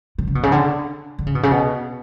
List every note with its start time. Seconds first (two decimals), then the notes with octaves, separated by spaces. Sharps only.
0.18 D3
0.27 C#3
0.35 B2
0.43 C#3
0.52 D3
1.19 D3
1.26 C#3
1.35 B2
1.43 C#3
1.52 B2